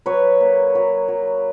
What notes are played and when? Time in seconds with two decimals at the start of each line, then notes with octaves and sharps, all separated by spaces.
0.06 F#3 B4 C#5
0.41 A#3
0.75 F#3
1.08 F#3